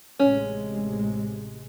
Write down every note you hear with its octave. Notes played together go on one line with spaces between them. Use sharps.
A1 C3 G#3 C#4